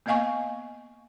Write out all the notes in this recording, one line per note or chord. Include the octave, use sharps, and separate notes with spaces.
A#3 B3 D#5 F5 G#5 C#6